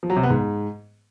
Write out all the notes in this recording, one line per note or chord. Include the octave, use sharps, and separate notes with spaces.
F3
F#3
C3
B3
G#2